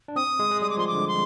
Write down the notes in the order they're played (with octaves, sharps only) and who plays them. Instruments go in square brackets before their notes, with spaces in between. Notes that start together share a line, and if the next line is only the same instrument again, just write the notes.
[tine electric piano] D4
[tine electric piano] C4 [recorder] D#6
[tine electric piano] G#3
G#3
[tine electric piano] G3 [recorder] D#6
[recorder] D6
[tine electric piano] F3 [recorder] C6
[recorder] D6
[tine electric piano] D3
[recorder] C6